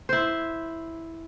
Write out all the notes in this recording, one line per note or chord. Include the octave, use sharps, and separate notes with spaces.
E4 C5